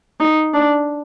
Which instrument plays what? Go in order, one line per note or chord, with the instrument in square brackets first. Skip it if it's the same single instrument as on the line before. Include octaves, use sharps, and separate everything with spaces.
[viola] D#4
D4